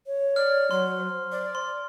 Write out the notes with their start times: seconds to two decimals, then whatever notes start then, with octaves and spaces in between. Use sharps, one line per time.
0.06 C#5
0.36 D5 F6
0.71 F#3 C6
0.98 C5
1.32 D5
1.55 C6